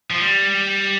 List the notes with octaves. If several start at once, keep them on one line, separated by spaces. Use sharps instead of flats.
F3
G3